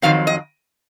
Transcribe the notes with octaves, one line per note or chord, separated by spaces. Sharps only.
F2 D#3 F#3 C4 F5
D#5